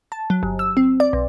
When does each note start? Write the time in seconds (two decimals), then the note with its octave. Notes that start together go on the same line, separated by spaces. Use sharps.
0.12 A5
0.30 F#3
0.43 G1
0.59 E6
0.77 C4
1.00 D5
1.13 B1